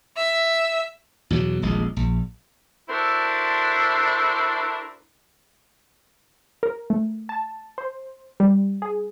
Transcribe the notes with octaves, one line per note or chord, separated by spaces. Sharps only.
E5
E2 B2 F#3
D#1 A#1 G#3
A#1
D4 E4 F#4 A4 A#4 C5
A#4
A3
A5
C5
G3
G#4